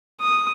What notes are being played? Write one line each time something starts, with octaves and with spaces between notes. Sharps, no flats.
D#6